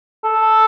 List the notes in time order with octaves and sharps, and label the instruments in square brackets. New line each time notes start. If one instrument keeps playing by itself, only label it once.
[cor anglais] A4